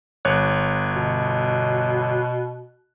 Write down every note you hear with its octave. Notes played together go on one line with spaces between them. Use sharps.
G1 C#5 F#6
B2